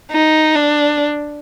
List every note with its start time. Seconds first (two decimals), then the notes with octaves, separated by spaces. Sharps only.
0.12 D#4
0.55 D4